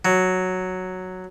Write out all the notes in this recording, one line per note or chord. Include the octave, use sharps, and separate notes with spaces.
F#3